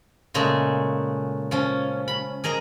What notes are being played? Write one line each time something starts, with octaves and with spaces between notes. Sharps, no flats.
A#2 C#3 G#3 A3
F3 C#4
B5
G#4 A#4 D#5 A#5